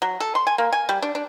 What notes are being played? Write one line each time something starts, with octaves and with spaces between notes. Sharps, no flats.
F#3
A4
C6
G#5
A#3
G#5
G3
D4
D4